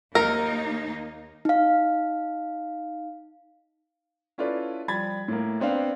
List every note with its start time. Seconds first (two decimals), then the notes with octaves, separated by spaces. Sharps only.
0.15 D#2 A#3 D#4 A#4
1.45 D#4 F5
4.38 C#4 E4 F4 A4 B4 D5
4.88 F3 G3 B5 G#6 A6
5.28 A2 A#3
5.60 B3 C4 D4 F5